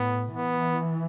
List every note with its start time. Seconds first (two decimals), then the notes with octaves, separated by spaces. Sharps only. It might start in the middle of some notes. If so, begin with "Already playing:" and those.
Already playing: A2 B3
0.36 E3 B3